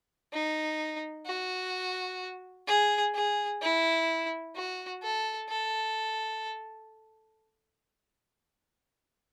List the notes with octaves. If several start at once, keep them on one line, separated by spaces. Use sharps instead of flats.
D#4
F#4
G#4
G#4
E4
F#4
A4
A4